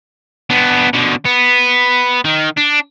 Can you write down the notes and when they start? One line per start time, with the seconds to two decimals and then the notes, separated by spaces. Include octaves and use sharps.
0.50 B3 D4
0.94 B2 D3
1.25 B3
2.25 D#3
2.57 D4